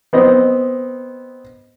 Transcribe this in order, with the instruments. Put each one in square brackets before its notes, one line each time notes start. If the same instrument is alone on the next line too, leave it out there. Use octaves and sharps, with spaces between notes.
[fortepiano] B3 C4 D#5